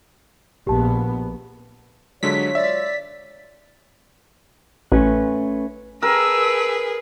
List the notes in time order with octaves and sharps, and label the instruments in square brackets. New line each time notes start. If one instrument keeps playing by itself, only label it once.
[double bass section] A#1 B3 [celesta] G4 A5
[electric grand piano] D3 F#3 G#3 [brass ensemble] F4 C#5 [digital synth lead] B6
[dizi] D5 [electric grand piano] E5
[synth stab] A1 [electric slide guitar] A3 C#4 B4
[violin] G#4 B4 [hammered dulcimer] A#4 [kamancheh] A5 E6